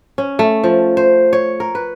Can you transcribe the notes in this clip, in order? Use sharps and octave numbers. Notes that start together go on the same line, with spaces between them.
C#4
A3
F3
C5
C#5
A#4
B4